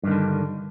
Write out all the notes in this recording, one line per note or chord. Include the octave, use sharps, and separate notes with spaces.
G2 D3 D#3